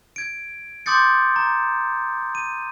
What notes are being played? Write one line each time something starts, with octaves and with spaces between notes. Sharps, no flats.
G#6 D7
C6 D6 D#6 G6 A6 C#7
A#5
D#7